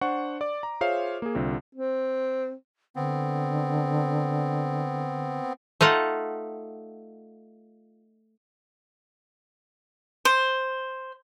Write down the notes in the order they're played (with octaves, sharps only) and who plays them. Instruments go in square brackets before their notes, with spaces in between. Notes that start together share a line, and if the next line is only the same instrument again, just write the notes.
[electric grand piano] D4 C5 F#5 C#6
D5 D6
A#5
F4 G#4 C5 C#5 E5 F5
A#3 G#4
C2 D3 C4 F4
[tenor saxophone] C4
[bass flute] D3 [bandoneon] B3 C4
[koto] A3 D#4 F4 F#5
[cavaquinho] C5